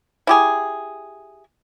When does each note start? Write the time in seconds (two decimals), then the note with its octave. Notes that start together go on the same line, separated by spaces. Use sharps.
0.27 E4 G4 G#4